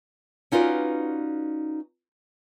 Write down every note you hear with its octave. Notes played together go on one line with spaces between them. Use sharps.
C#4 D#4 F4 F#4 B4 D5